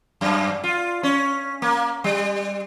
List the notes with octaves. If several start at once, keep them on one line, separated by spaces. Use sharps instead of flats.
F#2
F4
C#4
A#3
G3